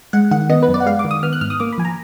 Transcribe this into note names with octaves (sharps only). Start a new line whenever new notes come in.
G#3 F#5
D#3 F#5
B3 D#5
B4
F#2
D5
F#5
G#3 F5
D6
D#3
D#6
B3 F6
F#6
G#2 F6
D#6
A#3 D6
B5
F3 G#5
A#5